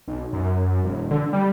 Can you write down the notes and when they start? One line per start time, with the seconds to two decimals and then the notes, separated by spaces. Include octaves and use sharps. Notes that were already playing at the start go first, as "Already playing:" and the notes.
0.08 B1
0.33 F#2
0.85 E1
1.11 D3
1.33 G3